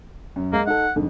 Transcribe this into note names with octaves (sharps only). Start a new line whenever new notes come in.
F#2
G#3 A#3
D#4 A4 F#5
F2 G#2 D3